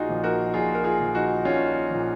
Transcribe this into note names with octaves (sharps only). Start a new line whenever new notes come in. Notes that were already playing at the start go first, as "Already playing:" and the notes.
Already playing: A#1 D#4 F4 F#4 G#4
A#2 F3
F#4 A#4
A#1 F4 G#4
A#4
F4 G#4
A#2 F3
D#4 F#4
A#1 C#4 F4
A#2 F3